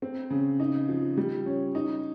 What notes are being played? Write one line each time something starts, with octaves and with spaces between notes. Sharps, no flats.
C4
C#3
D#4
F3
G3
C#4
D#4